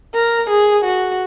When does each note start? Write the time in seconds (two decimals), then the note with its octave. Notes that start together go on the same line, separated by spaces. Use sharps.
0.14 A#4
0.50 G#4
0.84 F#4